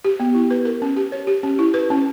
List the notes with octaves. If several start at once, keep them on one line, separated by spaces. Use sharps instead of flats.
G4
B3
E4
B4
A#4
C#4
G4
C#5
G4
C#4
E4
B4
C#4